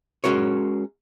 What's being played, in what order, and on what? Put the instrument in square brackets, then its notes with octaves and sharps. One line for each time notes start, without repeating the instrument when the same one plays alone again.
[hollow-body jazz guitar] G#3 C#4 F#4 A#4 C#5